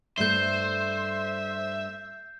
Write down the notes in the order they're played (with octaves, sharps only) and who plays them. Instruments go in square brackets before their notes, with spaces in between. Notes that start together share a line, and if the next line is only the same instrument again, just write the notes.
[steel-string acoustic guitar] G2 A3 [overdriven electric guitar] C5 [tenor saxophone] E5 [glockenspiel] G6 C7